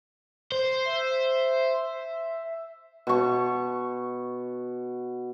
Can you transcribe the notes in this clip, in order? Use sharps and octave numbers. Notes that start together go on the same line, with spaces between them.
C5
E5
B2 C#6